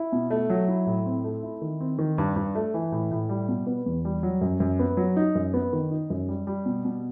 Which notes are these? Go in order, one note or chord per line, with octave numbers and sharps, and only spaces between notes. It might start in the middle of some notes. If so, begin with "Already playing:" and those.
Already playing: E4
B2
A3
F#3
E4
A2
C4
A3
E4
D#3
C4
D#3
G2
G2
A3
E3
A2
A2
G3
B2
B3
E2
G3
F#3
F#2
F#2
B3
F#3
D#4
F#2
B3
D#3
D#4
F#2
G3
G3
B2
B2